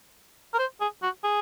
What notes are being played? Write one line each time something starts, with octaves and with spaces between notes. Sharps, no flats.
A#4
C5
G#4
F#4
G#4